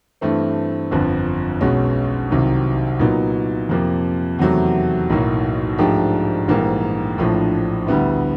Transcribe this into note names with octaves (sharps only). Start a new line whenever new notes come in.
G2 E3 A3 C4
G1 F2 D3 F3
B1 B2 G#3 C#4
C2 C3 D#3 F#3
A#2 F#3 B3 D#4
F2 C3 F3 A#3
E2 C3 D#3 F#3 A3
B1 A2 F#3 A#3 D#4
G#2 F3 A3 D4 G4
A#1 G#2 E3 G3 A#3
A#1 A2 F3 A3 D4
D2 D3 G3 B3 E4